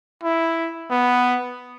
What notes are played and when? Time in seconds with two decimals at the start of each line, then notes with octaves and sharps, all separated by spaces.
0.23 E4
0.91 B3